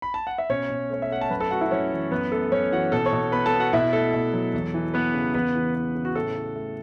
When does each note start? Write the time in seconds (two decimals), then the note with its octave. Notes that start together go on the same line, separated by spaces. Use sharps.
0.02 B5
0.14 A5
0.27 F#5
0.38 E5
0.49 B2 C#4 C#5
0.70 B2
0.90 A3 C#5
1.02 E5
1.10 A3 F#5
1.21 A5
1.30 F#2 B4 B5
1.40 A4 A5
1.51 A3 F#4 F#5
1.61 E4 E5
1.71 F#2 C#4 C#5
1.92 E3
2.11 F#2 B3 B4
2.32 A3 A4
2.52 F#2 C#4 C#5
2.72 E3 F#4 F#5
2.92 B2 A4 A5
3.06 C#5 C#6
3.13 B2
3.32 B3 B4 B5
3.46 A4 A5
3.53 B3
3.59 F#4 F#5
3.73 B2 E4 E5
3.93 A3 A4
4.14 B2
4.34 F#3
4.54 E2
4.74 E3
4.94 B3 B4
5.14 C#3
5.34 E2 B3 B4
5.55 E3
5.75 B3
5.95 C#3
6.05 F#4
6.15 A2 A4
6.36 A2
6.56 A3